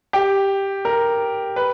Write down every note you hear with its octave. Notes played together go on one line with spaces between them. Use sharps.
G4
A#4
B4